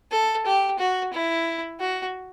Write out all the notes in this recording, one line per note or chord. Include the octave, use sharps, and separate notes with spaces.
A4
G4
F#4
E4
F#4